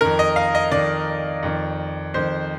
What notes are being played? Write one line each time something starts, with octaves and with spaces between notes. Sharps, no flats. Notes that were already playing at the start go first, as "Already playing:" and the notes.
F2 D#3 A#4
D#5
F5
D#5
F2 D#3 D5
F2 D#3
F2 D#3 C5